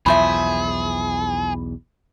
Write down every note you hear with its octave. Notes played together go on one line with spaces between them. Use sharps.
B1 E2 A2 F3 G#4 E5 B5